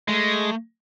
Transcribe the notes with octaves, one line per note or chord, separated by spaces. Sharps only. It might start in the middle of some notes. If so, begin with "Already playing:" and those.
G#3 A3